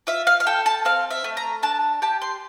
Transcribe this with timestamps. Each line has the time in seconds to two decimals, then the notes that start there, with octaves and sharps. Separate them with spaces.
0.07 F4 E5
0.27 F5
0.40 F5
0.46 A4 G5
0.66 A5
0.85 C4 F5
1.11 E5
1.24 A3
1.37 A#5
1.63 D4 A5
2.02 G4 A5
2.22 C6